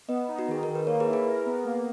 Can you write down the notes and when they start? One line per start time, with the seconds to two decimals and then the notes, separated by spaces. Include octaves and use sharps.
0.08 B3 B4 D#5
0.28 D#4
0.39 F#4
0.48 D#3 G#4
0.63 D#3 A#4
0.75 B4
0.87 A#3 A#4 C#5
1.00 G#4 B4
1.06 E4
1.13 G#4 B4
1.26 A#4
1.46 B3
1.65 A#3